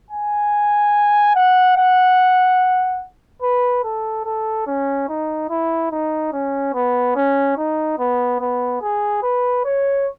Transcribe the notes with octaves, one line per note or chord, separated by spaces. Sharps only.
G#5
F#5
F#5
B4
A4
A4
C#4
D#4
E4
D#4
C#4
B3
C#4
D#4
B3
B3
G#4
B4
C#5